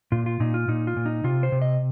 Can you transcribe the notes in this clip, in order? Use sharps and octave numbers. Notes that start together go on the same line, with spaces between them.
A#2 F4
F4
A#2 D#4
F4
A#2 D#4
F4
A#2
D#4
C3 F4
C5
C3
D#5